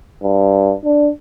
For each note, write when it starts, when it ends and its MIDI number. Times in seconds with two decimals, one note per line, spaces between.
0.23 0.73 43
0.85 1.10 62